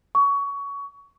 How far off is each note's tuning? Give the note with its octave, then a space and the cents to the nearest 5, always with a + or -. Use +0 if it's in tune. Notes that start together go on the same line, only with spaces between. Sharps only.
C#6 +20